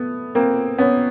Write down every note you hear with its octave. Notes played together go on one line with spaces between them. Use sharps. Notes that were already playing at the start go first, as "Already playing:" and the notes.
Already playing: A3 B3
A#3 C4
B3 C#4